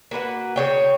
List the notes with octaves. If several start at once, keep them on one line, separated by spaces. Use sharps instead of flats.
A#3 F#4 B4 F#5
C#3 C#5 G5